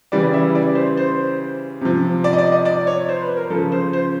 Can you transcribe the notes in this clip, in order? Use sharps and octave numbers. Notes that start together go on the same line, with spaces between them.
C#3 E3 G3 D5
E5
D5
C5
C5
C3 F3
D5
D#5
D5
D#5
D5
C#5
C5
B4
A#4
C#3 F3 A4
C5
C5